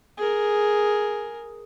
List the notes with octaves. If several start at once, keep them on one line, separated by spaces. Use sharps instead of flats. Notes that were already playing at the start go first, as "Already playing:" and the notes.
G#4 A#4